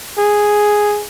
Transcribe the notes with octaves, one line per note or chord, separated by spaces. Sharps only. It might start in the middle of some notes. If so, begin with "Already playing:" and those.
G#4